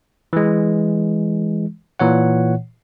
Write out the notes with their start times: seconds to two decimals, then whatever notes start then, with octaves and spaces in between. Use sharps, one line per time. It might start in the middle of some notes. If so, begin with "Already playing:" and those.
0.33 E3 G#3
2.00 A#2 E3 C#5 F#5